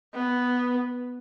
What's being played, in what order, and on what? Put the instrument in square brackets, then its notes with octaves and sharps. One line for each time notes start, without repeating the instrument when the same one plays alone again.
[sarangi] B3